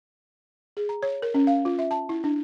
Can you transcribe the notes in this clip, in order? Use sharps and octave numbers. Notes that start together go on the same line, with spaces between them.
G#4
A#5
C#5
A#4
C#4
F5
F4
E5
A5
E4
D4